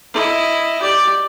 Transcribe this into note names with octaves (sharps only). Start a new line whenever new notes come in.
E4 D#5
G4 D5